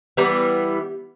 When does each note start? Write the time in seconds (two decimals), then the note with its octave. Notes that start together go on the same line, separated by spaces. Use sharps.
0.17 E3 G3 B3